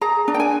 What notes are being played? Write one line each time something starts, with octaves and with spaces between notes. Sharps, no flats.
G#4 A#5
D4
G5
G#5